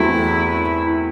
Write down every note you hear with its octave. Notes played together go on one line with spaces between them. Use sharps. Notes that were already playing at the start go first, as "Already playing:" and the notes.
Already playing: E2 F#3 A3 C4 E4